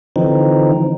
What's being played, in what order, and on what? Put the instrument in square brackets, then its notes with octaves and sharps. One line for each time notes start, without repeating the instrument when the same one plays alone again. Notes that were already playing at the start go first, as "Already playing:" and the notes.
[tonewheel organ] D3 E3 F3 C4 D#4